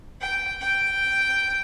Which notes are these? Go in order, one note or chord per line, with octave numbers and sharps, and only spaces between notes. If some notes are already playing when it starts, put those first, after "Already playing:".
G5
G5